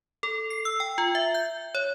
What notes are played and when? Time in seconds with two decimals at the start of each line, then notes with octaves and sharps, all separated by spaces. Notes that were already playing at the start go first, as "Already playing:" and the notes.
0.23 A4
0.50 C7
0.65 E6
0.80 G5
0.98 F4
1.15 E5
1.34 G6
1.75 C#5